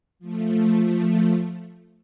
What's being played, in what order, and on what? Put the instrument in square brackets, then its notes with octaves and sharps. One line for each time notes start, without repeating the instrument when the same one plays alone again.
[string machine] F3 A3